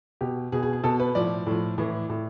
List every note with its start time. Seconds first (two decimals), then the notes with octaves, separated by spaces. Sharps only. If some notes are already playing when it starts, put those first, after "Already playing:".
0.21 B2 G4
0.52 B2 G#4
0.63 G#4
0.73 G#4
0.84 B2 A4
1.00 B4
1.15 A2 F3 D5
1.46 A2 F3
1.78 A2 E3
2.10 A2